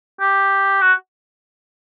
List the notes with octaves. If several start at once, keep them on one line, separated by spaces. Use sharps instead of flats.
G4
F#4